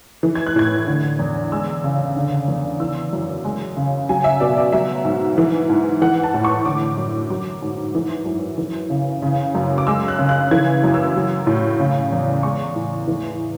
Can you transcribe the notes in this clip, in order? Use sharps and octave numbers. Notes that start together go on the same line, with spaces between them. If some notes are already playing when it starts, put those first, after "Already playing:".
E3
G#6
F#6
A2 G#6
D3
E2
G#3 E6
C#3
D3
E2
E3 E6
F#2
G#3
C#3
F#3 G#5
E5
B2 D5
D5
F#3 E5
G#2
E3
G#2
E3 F#5
A5
A2
C#6
D3 D6
F#2
F#3 D6
G#2
E3
F#2
E3
C#3
C#3
F#2
D6
G#3 E6
F#6
C#3
F#6
E3 G#6
F#2
E6
F#3
A2
C#3
E2
G#3 C#6
A2
E3